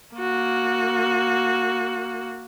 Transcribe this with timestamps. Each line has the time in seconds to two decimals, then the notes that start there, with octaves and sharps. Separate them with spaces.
0.15 A#3 F#4